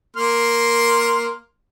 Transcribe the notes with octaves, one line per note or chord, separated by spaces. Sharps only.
A#3 C6 F6